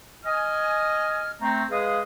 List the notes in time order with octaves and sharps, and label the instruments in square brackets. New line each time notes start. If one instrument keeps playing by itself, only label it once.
[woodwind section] D#5 G#5 F6
A3 C4 A#5
G#3 G#4 B4 D#5 F5